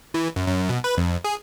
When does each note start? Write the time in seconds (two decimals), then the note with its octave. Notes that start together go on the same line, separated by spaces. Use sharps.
0.14 E3
0.36 F#2
0.47 F#2
0.69 B2
0.84 B4
0.97 F2
1.24 G#4